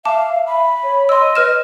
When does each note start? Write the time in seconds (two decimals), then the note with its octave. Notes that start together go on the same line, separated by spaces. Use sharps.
0.05 E5 F5 A5 D6
0.47 B5
0.83 C#5
1.09 D#5 C6 E6
1.35 B4 F6 E7